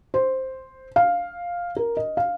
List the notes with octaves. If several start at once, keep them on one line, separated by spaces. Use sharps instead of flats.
C5
F5
A#4
D#5
F5